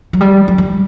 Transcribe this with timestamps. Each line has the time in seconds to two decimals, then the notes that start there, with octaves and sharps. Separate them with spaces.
0.13 F#3
0.21 G3
0.48 F#3
0.58 G3